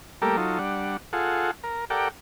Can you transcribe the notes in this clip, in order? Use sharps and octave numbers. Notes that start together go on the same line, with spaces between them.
G3 A3 A#3 G4 A4 A#4
F#3 D#4 F4 A4
G3 D4 F#5
F4 G#4 A4 F#5
A#4
G4 A4 A#4 D5 F#5 G5